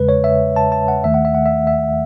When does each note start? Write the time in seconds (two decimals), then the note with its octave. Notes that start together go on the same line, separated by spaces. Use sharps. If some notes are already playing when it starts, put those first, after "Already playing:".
Already playing: E2 C#3 G#3 B4
0.09 C#5
0.24 E5
0.56 A5
0.72 A5
0.88 F#5
1.04 D#2 D#3 A3 E5
1.14 F#5
1.25 E5
1.35 F#5
1.46 E5
1.67 E5